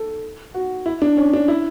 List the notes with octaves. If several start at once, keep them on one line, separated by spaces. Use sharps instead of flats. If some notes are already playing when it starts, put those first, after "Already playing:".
Already playing: A4
F#4
E4
D4
C#4
D4
E4